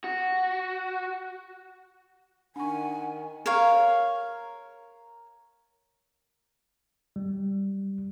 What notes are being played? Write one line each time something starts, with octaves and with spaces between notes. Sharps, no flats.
F#4
D#3 D4 F#5 G#5 C#6
A#4 C#5 F5
G3